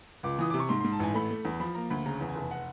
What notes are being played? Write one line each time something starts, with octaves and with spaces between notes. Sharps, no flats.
C#2 D6
E3 D#6
C3 D6
C#6
G#2 C6
G#2 C6
A5
A1 G#5
A3 B5
A3
E2
F3 B5
A#3 A#5
D2 B5
C#3 A#5
E2
G#5
F1
F#5